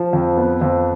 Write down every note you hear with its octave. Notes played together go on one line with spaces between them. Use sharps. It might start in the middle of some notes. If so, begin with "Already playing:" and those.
Already playing: F3
F2
B3
F2